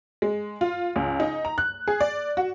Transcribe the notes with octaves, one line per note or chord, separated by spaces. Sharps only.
G#3
F4
C#2
D#4
A#5
F#6
G#4
D5
F#4